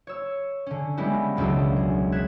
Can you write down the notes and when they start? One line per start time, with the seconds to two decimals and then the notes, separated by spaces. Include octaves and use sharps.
0.07 C#5 E6
0.66 D3 C#4
0.97 G3 G#3 B3 C#4 E4 G4
1.37 E1 C#2 F#3 D4 E6
1.76 G#4
2.12 F#6 G#6 B6 E7